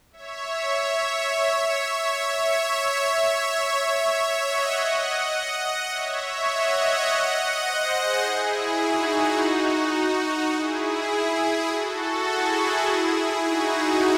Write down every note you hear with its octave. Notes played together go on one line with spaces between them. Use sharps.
C#5 E5
C#5 E5
C#5 E5
C#5 E5
C#5 E5
D#5 F#5
C#5 E5
D#5 F#5
C#5 E5
D#5 F#5
C5 D#5
G#4 C5
E4 G#4
D#4 F#4
D#4 F#4
E4 G#4
F#4 A4
E4 G#4
D#4 F#4